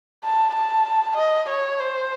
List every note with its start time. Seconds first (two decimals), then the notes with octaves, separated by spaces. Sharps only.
0.24 A5
0.55 A5
1.17 D#5
1.49 C#5
1.80 C5